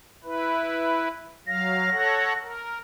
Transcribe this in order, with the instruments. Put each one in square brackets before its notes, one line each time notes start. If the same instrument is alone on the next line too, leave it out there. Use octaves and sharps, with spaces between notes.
[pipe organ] E4 B4
[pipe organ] F#3 F5 [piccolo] A#6
[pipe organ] A4 C#5 F#5
A#4